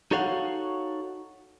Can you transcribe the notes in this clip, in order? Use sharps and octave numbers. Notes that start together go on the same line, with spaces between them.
D#4 F#4 A4 C#5 F5 F#5